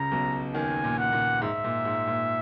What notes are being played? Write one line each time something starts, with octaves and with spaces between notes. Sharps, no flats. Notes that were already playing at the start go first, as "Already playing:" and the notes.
Already playing: C#2 C#3 A#5
B1 B2
D#2 D#3 G#5
A#2
F#5
A#2
G#2 E5
A#2
G#2
A#2